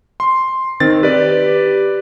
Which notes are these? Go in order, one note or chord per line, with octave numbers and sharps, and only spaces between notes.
C6
D#3 C4 A6
G4 B4 D5